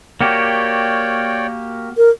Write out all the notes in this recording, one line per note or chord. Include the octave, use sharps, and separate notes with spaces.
A#3 F#4 G4 C#5 D5 G5
A#4